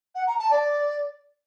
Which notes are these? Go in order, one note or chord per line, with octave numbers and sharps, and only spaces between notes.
F#5
A#5
A5
D5